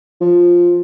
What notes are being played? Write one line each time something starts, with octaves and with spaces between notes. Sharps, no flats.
F3